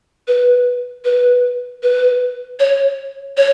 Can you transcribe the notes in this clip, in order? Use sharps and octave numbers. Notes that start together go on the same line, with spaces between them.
B4
B4
B4
C#5
C#5